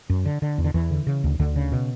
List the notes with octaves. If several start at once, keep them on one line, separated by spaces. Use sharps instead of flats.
F#2
D3
D3
E2
D3
E2 E3
D3
C#3
D2
D2 D3
C#3
B2